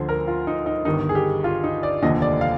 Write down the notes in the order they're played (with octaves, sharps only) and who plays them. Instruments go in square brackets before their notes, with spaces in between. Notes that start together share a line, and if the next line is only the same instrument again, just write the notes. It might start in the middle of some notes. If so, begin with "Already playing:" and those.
Already playing: [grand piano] D2 D3 F3 C5
A#4
F4
D#4
D#4
G1 G2 D#3 D#4
G#4
G4
F4
D#4
D5
F1 D#2 D3 F3 D#5
D5
F5